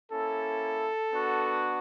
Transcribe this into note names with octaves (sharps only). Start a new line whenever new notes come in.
A#3 C#4 E4 A4
B3 D4 F#4